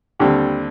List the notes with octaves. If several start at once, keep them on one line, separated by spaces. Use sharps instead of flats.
D#2 D3 G3 C4